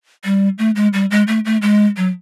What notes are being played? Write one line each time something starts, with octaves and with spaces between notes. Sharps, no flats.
G3
A3
G#3
G3
G#3
A3
A3
G#3
F#3